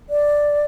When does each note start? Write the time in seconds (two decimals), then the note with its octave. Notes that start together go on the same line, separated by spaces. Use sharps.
0.10 D5